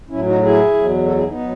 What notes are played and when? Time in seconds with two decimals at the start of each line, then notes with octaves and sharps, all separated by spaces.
0.09 A2 F#3 C#4 E4
0.25 D#4 F#4
0.41 E4 G#4
0.74 E2 B2 F#3
1.05 F#4 A4
1.16 E4 G#4
1.27 B3 D#4
1.39 F#3